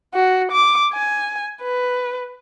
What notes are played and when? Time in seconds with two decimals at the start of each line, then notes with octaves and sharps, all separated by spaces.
0.13 F#4
0.51 D6
0.92 G#5
1.61 B4